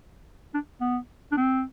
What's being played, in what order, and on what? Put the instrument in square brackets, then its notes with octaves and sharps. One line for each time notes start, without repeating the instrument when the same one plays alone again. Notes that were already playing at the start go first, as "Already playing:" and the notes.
[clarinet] D4
B3
D4
C4